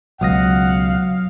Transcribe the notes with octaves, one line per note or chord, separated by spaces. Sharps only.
C#2 B2 F#3 F5 F#5 D#6 A#6